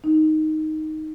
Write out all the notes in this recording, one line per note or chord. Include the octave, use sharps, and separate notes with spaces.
D#4